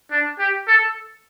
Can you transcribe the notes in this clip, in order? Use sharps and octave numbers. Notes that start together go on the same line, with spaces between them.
D4
G4
A4